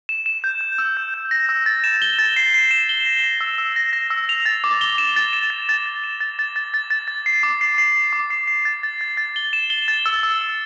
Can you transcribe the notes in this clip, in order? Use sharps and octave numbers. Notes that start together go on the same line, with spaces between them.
E7
E7
G6
G6
E6
G6
G6
A#6
E6
A6
E7
G7
A6
C7
C7
E7
G7
A#6
A#6
E6
E6
A#6
A#6
E6
F7
A6
D6
G7
E7
A6
E7
A6
A6
A6
E7
A6
A6
A6
A6
A6
A6
C7
D6
C7
C7
C7
D6
C7
C7
A6
A6
A6
A6
G7
E7
G7
A6
E6
E6
E6